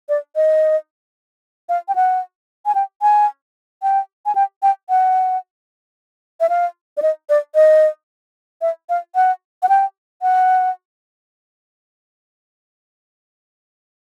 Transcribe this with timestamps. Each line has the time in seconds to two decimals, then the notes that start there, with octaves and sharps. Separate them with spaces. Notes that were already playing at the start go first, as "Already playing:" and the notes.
0.09 D5
0.36 D#5
1.69 F5
1.88 G5
1.95 F#5
2.66 G#5
2.75 G5
3.02 G#5
3.83 G5
4.26 G#5
4.35 G5
4.63 G5
4.89 F#5
6.40 E5
6.49 F5
6.97 D5
7.02 D#5
7.29 D5
7.55 D#5
8.62 E5
8.89 F5
9.15 F#5
9.63 F#5
9.69 G5
10.22 F#5